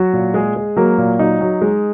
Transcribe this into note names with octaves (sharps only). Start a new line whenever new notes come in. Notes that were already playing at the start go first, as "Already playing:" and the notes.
Already playing: F#3 F#4
A#2
G#3 G#4
G#3
F#3 A#3 A#4
A#2
F#3 D#4
F#3
G#3